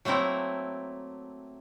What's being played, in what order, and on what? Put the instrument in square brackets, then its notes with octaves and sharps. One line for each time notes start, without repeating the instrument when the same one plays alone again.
[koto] F#3 A3 A#3 C4 E4